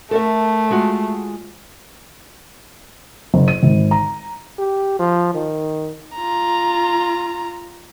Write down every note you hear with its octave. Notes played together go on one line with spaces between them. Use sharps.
A3 A4 A#4 E5
G#3 F4 F#4
F#1
D#7
G#1
A#5
G4
F3
D#3
F4 A#5